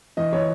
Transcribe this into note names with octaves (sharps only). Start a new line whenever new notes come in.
E3 D#5
E3 C#5